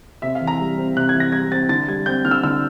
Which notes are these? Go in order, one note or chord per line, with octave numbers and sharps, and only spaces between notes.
C3 E5
F5
E3
A#5
G3
C4
C3 F#6
G#6
E3
A#6
G3 G#6
C4 A6
D3 A6
G3 G#6
C4 G6
D3 F6
E6
D3 E6